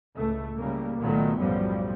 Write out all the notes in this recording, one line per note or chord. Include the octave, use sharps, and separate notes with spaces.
C#2 A2 A3
A2 C#3 G3 A3 A#3
C#2 A#2 D#3 F#3 A3 B3
B1 F#2 A2 F3 G3